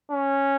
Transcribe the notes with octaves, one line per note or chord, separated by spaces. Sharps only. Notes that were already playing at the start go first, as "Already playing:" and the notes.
C#4